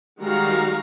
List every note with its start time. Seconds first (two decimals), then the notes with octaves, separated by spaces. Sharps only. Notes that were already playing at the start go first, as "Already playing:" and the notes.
0.20 D#3 G3 G#3 F#4 F5 A#5